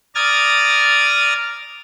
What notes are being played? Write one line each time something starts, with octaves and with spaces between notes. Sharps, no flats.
D5 A#5 D#6 F6 G#6 A6